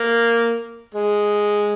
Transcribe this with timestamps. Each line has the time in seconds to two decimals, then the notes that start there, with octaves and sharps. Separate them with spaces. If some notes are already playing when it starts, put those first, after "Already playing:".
Already playing: A#3
0.94 G#3